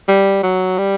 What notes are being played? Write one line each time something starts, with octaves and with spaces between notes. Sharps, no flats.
G3
F#3
G3